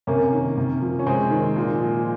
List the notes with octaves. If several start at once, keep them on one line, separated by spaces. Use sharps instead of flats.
C3 A#3 C#4
D#3
C3
F3
C#4
C3 G#3 C4
D#3
A#2
F3